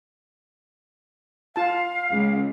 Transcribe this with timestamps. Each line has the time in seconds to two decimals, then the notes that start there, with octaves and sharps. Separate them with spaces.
1.56 F4 F5 A5
2.12 C#2